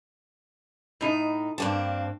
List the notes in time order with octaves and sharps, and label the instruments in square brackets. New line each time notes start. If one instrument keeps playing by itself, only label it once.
[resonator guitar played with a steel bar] A2 D#4
[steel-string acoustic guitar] G2 A#3 C4 [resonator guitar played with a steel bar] D4 A5